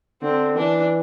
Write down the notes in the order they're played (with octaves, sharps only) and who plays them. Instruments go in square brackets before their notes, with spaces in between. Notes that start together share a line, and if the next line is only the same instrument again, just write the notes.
[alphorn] D3 [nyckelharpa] C4
[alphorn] E3 [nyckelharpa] D4